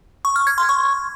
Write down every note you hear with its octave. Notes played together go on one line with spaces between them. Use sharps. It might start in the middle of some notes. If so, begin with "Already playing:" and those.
C#6
F6
G#6
C6
C#6